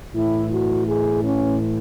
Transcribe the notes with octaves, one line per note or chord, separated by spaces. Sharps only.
A2 E3 E4
F#4
G#4
C#4